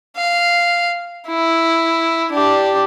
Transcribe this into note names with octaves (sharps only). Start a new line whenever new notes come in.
F5
E4
D4 G4